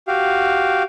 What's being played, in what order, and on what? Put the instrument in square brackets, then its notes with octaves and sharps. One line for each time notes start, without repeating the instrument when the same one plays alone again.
[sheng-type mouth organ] F#4 G4 F5